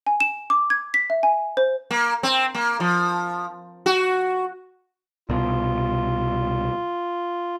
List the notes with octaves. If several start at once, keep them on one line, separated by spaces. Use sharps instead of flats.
G#5
E7
D6
G#6
B6
E5
G#5
C5
A#3
C4
A#3
F3
F#4
C2 B2 F4